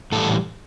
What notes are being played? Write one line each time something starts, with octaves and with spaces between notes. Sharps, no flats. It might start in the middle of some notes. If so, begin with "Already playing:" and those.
A2 E3 G3 A4